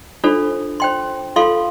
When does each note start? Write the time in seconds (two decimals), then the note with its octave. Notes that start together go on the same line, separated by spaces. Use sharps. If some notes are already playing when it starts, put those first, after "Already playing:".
0.24 D4 F4 A4 C5
0.80 C5 G5 C6
1.36 F4 A4 F5 C6